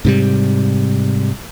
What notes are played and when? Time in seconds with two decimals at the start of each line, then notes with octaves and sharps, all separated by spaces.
0.05 G#2 C3 G3